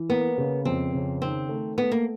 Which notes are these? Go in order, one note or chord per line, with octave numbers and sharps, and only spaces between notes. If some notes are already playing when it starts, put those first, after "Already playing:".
Already playing: E3
A#3 B3
C#3
F2 C4
C#3
D#3 C4
A3
A3 B3
A#3